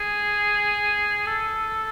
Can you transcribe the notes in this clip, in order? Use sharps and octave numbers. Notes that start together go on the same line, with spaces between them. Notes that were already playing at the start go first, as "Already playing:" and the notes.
Already playing: G#4
A4